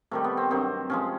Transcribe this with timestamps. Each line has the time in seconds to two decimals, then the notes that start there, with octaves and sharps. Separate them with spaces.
0.11 C3 D#3 G3 A3
0.24 B3
0.37 C4
0.50 G2 D#3 F#3 C4
0.90 C3 F3 G#3 C#4